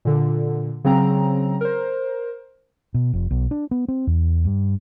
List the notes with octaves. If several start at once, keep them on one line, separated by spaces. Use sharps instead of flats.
A#2 D3
C#3 F#3 C4 A#5
A#4 C5
B2
F1
B1
D4
B3
C4
E2
G2